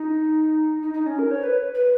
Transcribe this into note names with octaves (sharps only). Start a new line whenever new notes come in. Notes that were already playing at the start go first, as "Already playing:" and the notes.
Already playing: D#4
D#4
D#4
C#4
A#4
C#5
B4
B4